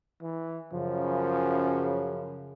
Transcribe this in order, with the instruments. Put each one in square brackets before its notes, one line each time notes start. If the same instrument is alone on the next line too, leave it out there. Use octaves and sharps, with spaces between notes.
[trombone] E3
[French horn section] F#2 C#3 [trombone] F3